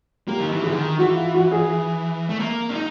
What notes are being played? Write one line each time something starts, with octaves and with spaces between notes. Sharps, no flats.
A#3 G4
D#3
E3
D3 G#4
D#3
E3 F#4
F4
F#4
G#4
A3
A#3
D4
D#4